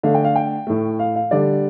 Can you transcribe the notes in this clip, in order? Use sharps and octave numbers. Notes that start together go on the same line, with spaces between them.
D3 A3 F5
G5
F5
G5
A2 A3
F5
F5
D3 G3 D5